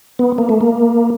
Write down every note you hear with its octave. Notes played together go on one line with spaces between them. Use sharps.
B3
A#3
A3
A#3